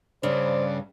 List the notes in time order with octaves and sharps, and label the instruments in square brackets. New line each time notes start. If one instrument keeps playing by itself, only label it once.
[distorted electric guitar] G2 [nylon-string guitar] C#3 [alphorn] C5 [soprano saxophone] D5